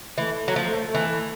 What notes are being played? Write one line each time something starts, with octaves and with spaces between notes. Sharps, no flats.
E3 A3
F#3
F3
E3